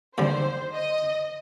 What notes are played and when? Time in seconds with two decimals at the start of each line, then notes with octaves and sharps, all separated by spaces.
0.17 D#2 D3 G3 C5
0.75 D#5